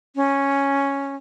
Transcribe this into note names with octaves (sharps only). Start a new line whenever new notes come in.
C#4